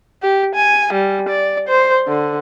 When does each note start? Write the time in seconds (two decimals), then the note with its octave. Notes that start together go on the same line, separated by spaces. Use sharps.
0.22 G4
0.55 G#5
0.93 G3
1.29 D5
1.68 C5
2.08 D3